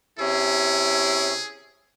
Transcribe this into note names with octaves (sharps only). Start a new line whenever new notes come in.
C3 C#4 E4 G#4